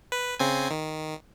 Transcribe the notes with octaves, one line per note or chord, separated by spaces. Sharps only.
B4
C#3 C4 G#5
D#3